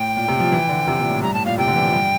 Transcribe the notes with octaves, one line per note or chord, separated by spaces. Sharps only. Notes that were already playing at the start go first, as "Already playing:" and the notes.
Already playing: A2 G5
A#2
C3
F3
E3
D3
C3
A#2
A2
G2 A#5
A2 A5
A#2 F5
C3 G5
D3
E3
F3
G2